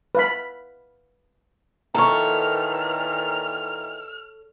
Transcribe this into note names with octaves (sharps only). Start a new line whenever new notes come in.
B4 F5 B5
A#2 D#3 E3 A4 C#5 A#5 C#6 F6